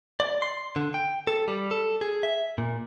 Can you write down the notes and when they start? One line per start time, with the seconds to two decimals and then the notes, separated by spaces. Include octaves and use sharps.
0.20 D5
0.42 C6
0.76 D3
0.94 G5
1.27 A4
1.48 G3
1.71 A4
2.01 G#4
2.23 E5
2.58 A#2